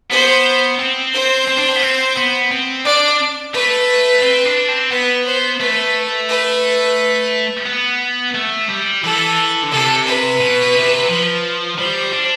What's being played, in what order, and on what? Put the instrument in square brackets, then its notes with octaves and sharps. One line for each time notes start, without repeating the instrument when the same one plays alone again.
[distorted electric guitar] B3 [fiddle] C5
[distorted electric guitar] C4
[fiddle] C5
[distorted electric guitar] C4
D4
C4
B3
C4
B3
C4
[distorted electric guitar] D4 [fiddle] D5
[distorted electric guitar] A3 [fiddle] B4
[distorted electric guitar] C4
D4
C4
[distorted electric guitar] B3 [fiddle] B4
[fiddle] C5
[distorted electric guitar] A3 [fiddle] B4
[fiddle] B4
[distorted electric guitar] B3
A3
G3
[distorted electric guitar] E3 [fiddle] A4
[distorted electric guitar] D3
[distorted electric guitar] C3 [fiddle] A4
[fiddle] B4
[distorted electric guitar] B2
C3
F3
[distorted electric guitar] G3 [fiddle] C5
[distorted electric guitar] D4